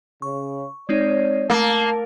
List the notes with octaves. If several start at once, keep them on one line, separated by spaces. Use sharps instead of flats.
C#3 C#6
G#3 C4 D#4 C#5 D5
A3 A#3 A5